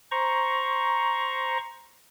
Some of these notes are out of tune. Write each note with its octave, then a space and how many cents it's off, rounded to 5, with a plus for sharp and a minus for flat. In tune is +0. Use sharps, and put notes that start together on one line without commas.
C5 +0 A#5 +10 C#6 +5